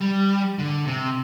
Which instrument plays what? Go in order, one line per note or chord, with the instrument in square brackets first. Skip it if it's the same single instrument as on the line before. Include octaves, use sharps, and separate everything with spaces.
[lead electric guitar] G3
D3
C3